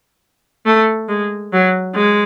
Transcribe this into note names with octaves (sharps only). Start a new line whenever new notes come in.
A3
G#3
F#3
G#3